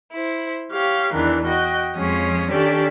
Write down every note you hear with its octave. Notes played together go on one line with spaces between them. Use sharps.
E4 C5
G4 C#5 F5
E2 D#3 E3 D4
F#4 D#5 G5
F2 F3 G#3 C#4 C#5 D#6
D#3 C#4 D4 G4 A4 D5